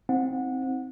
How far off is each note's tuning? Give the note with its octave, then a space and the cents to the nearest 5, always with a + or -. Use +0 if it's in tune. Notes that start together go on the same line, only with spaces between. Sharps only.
C4 +0 D#4 +25 F#5 -25